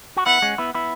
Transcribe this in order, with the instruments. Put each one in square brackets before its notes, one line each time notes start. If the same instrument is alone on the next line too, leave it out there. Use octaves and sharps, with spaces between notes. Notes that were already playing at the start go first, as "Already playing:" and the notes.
[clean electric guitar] F#4
[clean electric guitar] B3 E4 [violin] F#5
[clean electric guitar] G#3 C#4
B3 E4
B3 E4